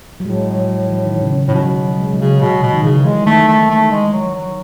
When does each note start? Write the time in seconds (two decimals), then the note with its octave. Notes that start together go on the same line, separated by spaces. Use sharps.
0.20 F#3
0.25 A2 G#3
0.57 F#3
0.81 F#3
0.89 E3
1.06 D#3
1.22 C#3
1.38 C#3
1.47 A2
1.54 B2 F#3
1.86 F#3
2.00 G#3
2.13 F#3
2.19 C#3
2.41 B2
2.63 B2
2.73 D#3
2.83 C#3 E3
3.05 E3 G#3
3.26 D#3 A3
3.48 A3
3.70 A3
3.91 G#3
4.13 F#3
4.35 F#3